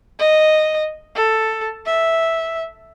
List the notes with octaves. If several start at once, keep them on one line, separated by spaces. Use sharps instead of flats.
D#5
A4
E5